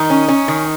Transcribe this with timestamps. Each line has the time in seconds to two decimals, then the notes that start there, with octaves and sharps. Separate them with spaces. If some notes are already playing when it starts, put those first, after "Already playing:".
Already playing: D#3 D#4
0.10 C#4
0.28 C#4
0.48 D#3